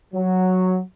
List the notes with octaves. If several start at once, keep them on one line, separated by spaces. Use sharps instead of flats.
F#3